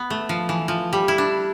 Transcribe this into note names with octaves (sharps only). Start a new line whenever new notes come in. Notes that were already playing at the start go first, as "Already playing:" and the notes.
Already playing: B3
A3
F3
E3
F3
G3
E4
D4